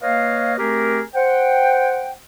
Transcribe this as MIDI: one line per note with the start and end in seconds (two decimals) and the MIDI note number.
0.02 0.55 58
0.02 0.55 71
0.02 0.55 73
0.02 0.55 75
0.02 0.55 77
0.58 1.01 57
0.58 1.01 60
0.58 1.01 67
0.58 1.01 68
0.58 1.01 70
1.15 2.13 72
1.15 2.13 78
1.15 2.13 79